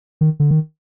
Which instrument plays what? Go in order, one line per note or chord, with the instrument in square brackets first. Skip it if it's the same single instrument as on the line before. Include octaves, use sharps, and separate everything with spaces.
[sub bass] D#3
D3
D#3